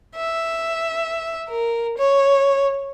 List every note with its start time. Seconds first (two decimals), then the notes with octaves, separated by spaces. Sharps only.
0.16 E5
1.49 A#4
1.98 C#5